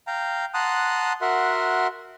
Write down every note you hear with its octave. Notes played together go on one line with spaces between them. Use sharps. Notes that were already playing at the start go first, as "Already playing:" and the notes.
F5 G5 A#5
F#5 A5 A#5 C6 D#6 F#6
F#4 A#4 E5 F#5 C6